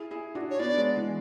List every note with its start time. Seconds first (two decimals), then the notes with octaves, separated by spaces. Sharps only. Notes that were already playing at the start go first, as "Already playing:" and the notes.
Already playing: E4 G#4
0.11 E4 G#4
0.35 D4 F#4
0.51 C#5
0.59 B3 D4 D5
0.77 G#3 B3
0.96 E3 G#3